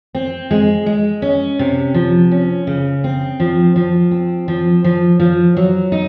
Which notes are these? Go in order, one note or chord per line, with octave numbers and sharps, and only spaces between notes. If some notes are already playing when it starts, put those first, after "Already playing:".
C4
G#3
G#3
C#4
C3
F3
C#4
C#3
C4
F3
F3
C4
F3
F3
F3
F#3
D#4